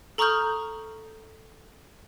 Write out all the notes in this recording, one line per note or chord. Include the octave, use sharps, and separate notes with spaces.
A4 A#5 C#6 D#6 F6 G6